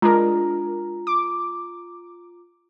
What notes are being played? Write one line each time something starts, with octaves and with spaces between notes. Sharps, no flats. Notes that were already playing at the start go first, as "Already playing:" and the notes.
G#3 D4 F4 A#4 A#5
D6